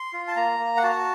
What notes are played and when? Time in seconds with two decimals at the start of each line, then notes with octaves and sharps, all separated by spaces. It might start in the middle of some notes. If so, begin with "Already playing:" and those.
Already playing: C6
0.13 F4
0.28 A5
0.36 A#3 A#5
0.59 A#3
0.77 F#5
0.83 F#4 A5